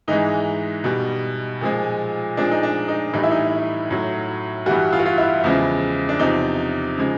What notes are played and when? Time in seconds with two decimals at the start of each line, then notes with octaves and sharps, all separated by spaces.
0.08 G#2 E3 G#3 D#4
0.84 B2 G3
1.61 A#2 F3 G#3
2.37 A#2 F3 G#3 D4
2.51 D#4
2.63 D4
2.88 D#4
3.13 A2 E3 G3 D#4
3.23 E4
3.31 D#4
3.90 A2 F#3
4.66 G2 E3 G3 F#4
4.93 F4
4.99 F#4
5.06 F4
5.18 E4
5.44 E2 C#3 F3 G#3
6.09 D4
6.19 E2 C3 F3 D#4
6.97 C#3 F3 G#3